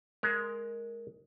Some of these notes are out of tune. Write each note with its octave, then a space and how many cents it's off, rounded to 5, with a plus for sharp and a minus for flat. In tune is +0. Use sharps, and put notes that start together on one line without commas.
G#3 +10 A#4 +0